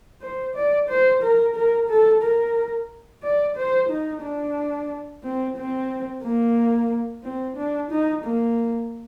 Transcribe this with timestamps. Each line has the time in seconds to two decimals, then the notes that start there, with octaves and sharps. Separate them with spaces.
0.22 C5
0.55 D5
0.89 C5
1.22 A#4
1.56 A#4
1.89 A4
2.23 A#4
3.23 D5
3.56 C5
3.90 D#4
4.23 D4
5.24 C4
5.57 C4
6.23 A#3
7.24 C4
7.57 D4
7.91 D#4
8.24 A#3